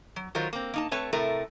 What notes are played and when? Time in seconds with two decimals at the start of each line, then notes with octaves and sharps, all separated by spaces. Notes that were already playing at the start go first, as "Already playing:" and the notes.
0.16 F#3
0.35 D#3 F#3 F4 A#4 C5
0.53 A#3 C4
0.74 A#3 D#4 A5
0.91 A3 C4 B4 C#5 A5
1.13 A2 C3 A3 A#4